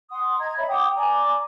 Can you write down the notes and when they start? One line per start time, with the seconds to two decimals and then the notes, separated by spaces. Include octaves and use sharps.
0.11 F#5 C6 D#6
0.39 D#5 A#5 G#6
0.57 C#5 D#5 E5 B5
0.69 F#5 G5 D6 D#6
0.96 D5 G#5 A#5 D6